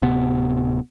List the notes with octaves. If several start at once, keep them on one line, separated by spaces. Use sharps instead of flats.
D1 C3 B3